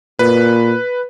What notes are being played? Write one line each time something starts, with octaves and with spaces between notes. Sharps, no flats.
A#2 B4